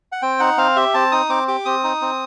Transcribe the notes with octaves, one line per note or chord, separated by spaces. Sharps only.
F#5
C4 G5
D#4 F#5
C4 F5
G4 E5
C4 A5
D#4 D#6
C4 D6
G4 D6
C4 D#6
D#4
C4